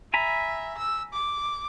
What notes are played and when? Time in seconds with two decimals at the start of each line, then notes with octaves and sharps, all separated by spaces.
0.14 E5 G#5 A#5 B5
0.78 E6
1.13 D6